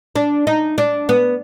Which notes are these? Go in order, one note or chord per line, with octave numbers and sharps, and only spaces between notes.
D4
D#4
D4
B3